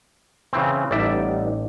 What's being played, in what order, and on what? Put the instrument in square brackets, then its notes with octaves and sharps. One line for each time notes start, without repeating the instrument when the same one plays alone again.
[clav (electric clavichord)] C#3 E3 C4
[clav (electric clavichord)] A1 D5 E5 [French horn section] G3 B3 D#4